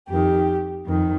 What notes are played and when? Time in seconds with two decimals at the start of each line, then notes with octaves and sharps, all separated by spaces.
0.09 F2 D#3 G4
0.86 F2 D#3